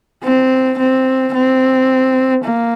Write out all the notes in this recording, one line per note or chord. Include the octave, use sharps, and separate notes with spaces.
C4
C4
C4
A#3